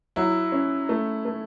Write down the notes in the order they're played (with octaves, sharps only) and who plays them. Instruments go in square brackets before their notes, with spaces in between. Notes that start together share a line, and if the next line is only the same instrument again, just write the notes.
[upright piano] F#3 [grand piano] E4
[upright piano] C#4
A3
A3